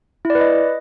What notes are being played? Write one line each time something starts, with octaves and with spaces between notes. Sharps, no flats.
E4
D5
B4
D#5